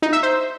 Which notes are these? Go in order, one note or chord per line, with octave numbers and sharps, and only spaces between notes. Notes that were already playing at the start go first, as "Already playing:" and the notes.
D#4
E5
C5